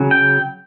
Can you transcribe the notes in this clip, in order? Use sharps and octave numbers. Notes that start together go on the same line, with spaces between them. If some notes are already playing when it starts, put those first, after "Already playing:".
Already playing: C#3 F#3 C#4
G5